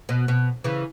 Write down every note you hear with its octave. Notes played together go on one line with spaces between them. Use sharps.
B2
B2
C#3 E3